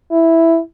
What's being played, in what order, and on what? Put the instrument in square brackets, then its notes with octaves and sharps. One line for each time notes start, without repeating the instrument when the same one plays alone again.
[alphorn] E4